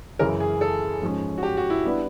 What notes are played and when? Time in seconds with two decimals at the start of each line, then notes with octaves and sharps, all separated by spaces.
0.19 F#2 C#3 E3 A#4
0.40 G#4
0.61 A4
1.02 G#2 F3 G#3 C#4
1.38 F#4
1.43 G4
1.57 F#4
1.70 E4
1.84 G3 B3 D4 F#4